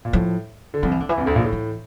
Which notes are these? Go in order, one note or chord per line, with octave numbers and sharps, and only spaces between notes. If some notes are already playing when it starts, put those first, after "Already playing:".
A#2
A2 F3
D3
C2 C3 F3
E3
D3
E3
C2 C3
D2 D3
A#1 A#2
A2
E3